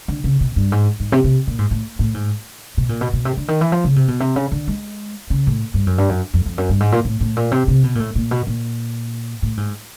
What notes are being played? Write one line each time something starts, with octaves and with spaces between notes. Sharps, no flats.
D3
C#3
B2
G2
G#2
G#2
C3
C3
A#2
G#2
A2
A2
G#2
B2
A#2
B2
B2
C3
D3
D#3
E3
F3
C#3
C3
B2
C3
C#3
D3
G#3
C#3
A2
G2
F#2
G2
F#2
F2
F2
F#2
G2
G#2
A#2
A2
A2
A#2
C3
C3
B2
A#2
A2
A#2
B2
A#2
A2
G#2